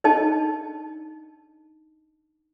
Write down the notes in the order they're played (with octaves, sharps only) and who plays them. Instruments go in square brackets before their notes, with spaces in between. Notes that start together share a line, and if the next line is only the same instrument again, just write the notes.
[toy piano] D4 D#4 D#5 A5